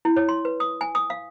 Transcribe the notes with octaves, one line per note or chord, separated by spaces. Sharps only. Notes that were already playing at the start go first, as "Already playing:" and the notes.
E4
C#5
C6
B4
D#6
G#5
D#6
F5